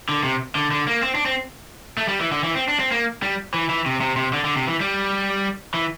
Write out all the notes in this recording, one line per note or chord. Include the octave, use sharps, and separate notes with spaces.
D3
C3
D3
D3
A#3
C4
D4
C4
A3
G3
E3
D3
E3
C4
D4
C4
A#3
G3
E3
E3
C3
C3
C3
D3
D3
C3
E3
G3
E3